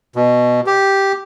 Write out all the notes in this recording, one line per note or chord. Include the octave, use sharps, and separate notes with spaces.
B2
G4